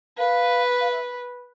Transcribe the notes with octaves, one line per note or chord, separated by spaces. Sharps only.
B4 F5
F5
E5